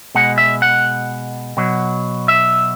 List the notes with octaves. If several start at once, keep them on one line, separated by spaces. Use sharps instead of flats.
B2 G#3 F#5
E5
F#5
B2 F#3
E5